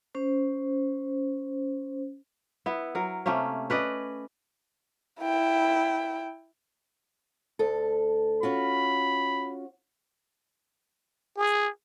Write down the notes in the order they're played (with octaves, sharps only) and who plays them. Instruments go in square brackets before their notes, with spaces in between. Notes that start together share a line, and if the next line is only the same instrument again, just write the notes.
[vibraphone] C#4 C5
[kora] B3 E4
F#3 A#4
C3 A3 A#3 C#4
C#4 B4 D5 D#5
[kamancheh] E4 G5
[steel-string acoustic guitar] D2 A4
[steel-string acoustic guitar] C#4 F4 F#4 [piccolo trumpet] B5
[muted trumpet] G#4